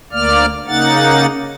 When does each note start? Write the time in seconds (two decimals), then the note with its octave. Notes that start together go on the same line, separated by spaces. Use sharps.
0.12 D2 A#3 D5 F6
0.67 C#3 A#3 D#4 F#5 A6